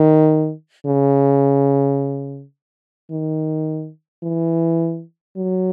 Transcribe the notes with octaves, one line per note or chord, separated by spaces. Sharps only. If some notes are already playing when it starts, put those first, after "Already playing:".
Already playing: D#3
C#3
D#3
E3
F#3